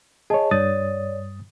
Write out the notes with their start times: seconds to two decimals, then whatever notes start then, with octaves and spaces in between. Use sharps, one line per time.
0.30 G#4 C#5 D#5 A5
0.51 G2 C#5 D5 D#6 A6